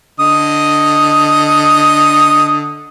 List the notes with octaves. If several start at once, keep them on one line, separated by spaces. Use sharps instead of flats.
D3 D#5 D#6